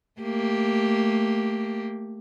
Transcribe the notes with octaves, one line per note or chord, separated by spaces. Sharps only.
A3 A#3 G4